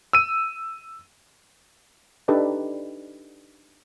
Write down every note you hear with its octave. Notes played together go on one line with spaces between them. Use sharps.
E6 D#7
D4 D#4 G4 A4 B4 D5